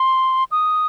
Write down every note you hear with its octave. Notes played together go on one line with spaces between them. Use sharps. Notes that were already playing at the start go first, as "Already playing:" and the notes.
Already playing: C6
D#6